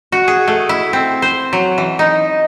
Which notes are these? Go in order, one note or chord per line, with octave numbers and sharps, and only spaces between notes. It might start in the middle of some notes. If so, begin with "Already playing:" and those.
F#4
G#4
A3
E4
C4
C5
F#3
E3
D#4